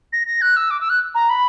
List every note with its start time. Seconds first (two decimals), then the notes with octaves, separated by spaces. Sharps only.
0.13 A#6
0.27 A#6
0.42 F#6
0.56 E6
0.71 D6
0.81 E6
0.90 F#6
1.15 A#5
1.29 B5